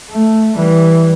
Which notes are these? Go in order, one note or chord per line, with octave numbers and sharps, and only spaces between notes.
A3
E3 G3